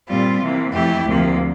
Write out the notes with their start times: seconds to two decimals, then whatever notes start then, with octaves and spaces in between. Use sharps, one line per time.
0.09 A#2 G3 C4 F4
0.41 C3 E3 A#3
0.72 F2 E3 A3 E4 G4
1.04 D2 C3 F3 A#3